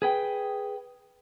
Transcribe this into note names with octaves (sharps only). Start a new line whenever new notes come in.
G#4 B4 G5